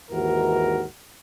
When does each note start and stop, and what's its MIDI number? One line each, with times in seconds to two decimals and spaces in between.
0.11 0.84 39
0.11 0.84 44
0.11 0.84 52
0.11 0.84 66
0.11 0.84 70